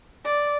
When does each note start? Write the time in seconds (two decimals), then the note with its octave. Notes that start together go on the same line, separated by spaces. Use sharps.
0.25 D5